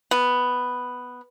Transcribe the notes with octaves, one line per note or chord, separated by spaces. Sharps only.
B3